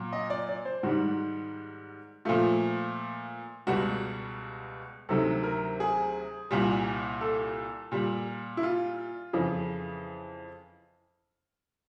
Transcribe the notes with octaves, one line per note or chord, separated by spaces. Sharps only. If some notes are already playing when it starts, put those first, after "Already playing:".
Already playing: A#2 F#3
D#5
D5
D5
C5
G#2 D#3 G3 F#4
A#2 F3 A3 F4
C#2 B2 G3 F#4
D2 C3 D#3 F#3 A4
A#4
G#4
C2 A#2 G3
A4
A#2 G3
E4
F4
F2 C#3 E3